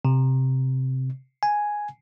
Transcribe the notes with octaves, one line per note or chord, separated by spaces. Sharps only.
C3
G#5